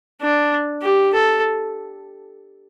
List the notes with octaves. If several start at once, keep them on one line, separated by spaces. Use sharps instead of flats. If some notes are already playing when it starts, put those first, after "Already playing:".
D4
G4
A4